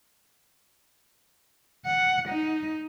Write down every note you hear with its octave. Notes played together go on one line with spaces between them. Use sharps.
F#5
D#4